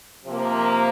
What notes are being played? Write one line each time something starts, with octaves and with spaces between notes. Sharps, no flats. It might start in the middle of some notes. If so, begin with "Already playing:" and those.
C3 F3 A#3